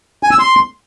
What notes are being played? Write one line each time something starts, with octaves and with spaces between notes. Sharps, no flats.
G#5
E6
C6